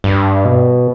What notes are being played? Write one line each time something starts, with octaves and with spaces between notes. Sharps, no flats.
G2
B2